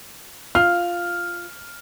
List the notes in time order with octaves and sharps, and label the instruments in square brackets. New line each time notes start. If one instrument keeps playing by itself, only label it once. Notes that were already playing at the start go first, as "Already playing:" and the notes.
[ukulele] F4 [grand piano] F6